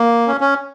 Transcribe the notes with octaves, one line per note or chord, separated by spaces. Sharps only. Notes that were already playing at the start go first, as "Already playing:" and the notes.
Already playing: A#3
C#4
C#4